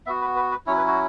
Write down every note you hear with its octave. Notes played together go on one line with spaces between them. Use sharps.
B3 F#4 E5
B4
B4
B4
F#3 C#4 E4 C#5
B4
F#4